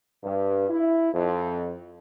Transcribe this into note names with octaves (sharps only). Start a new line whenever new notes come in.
G2
E4
F2